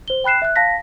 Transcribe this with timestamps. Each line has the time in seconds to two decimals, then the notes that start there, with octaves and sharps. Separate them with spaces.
0.08 C5 G7
0.24 G5 B5 F#6 C7 E7
0.42 E5 F#6
0.56 F5 A5 A#6 B6